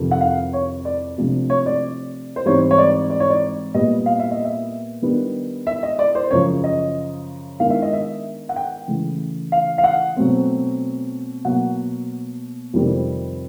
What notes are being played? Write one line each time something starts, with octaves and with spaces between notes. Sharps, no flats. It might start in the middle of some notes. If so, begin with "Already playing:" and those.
Already playing: F2 C3 D#3
F#5
F5
C#5
D5
C3 F3 A3 D4
C#5
D5
C5
G#2 E3 G3 C4 C#5
C#5
D5
D5
C#5
D5
A#2 G3 B3 D#5
F5
E5
D#5
E5
D#3 G3 B3 D4
E5
D#5
D5
C5
F#2 C#3 F3 C#5
D#5
D#3 G#3 B3 D4 F5
E5
D#5
E5
F#5
G5
C#3 E3 A3
F5
F5
F#5
B2 F#3 A3 C4
B2 F#3 A#3 F#5
F2 C3 D#3 G3 C4